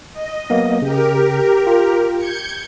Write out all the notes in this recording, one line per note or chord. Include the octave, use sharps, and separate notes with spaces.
D#5
F#3 A#3 B3
C#3 G4 A#4
F4
G6 G#6 C#7